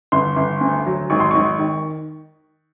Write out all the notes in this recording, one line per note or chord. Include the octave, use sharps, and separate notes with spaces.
G1 C6
G1
D2
F#3
G#1 C#6
C6
G#1 C#6
D#3